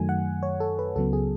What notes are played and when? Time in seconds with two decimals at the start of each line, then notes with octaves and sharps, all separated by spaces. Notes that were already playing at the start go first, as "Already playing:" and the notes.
Already playing: F#2 D#3 F#3 A3 G#5
0.09 F#5
0.43 C#5
0.60 A4
0.79 B4
0.95 C#2 C#3 F#3 B3 A4
1.13 G#4